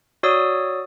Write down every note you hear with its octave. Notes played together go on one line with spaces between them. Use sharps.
F#4 C#5 D5 D#6 E6